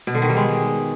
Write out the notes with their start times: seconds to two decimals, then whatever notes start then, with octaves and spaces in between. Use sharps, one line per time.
0.07 B2
0.15 D3
0.22 D#3
0.29 G3
0.37 G#3